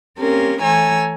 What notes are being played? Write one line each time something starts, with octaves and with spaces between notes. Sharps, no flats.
A#3 C4 C#4 G4 A#4
E3 A3 C#5 G#5 A#5 E6